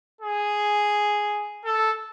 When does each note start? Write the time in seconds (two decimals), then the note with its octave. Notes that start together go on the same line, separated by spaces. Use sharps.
0.21 G#4
1.65 A4